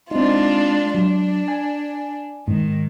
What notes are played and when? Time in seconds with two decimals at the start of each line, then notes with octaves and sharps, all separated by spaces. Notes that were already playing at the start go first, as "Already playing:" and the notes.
0.11 G#3 C4 D4 D#4 F4
0.95 F#3 D4
1.48 G#5
2.48 G#2 D#3